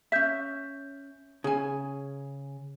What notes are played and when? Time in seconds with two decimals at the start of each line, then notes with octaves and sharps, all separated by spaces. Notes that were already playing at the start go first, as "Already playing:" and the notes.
0.12 C#4 E5 G6 B6
1.44 C#3 G#4 G#5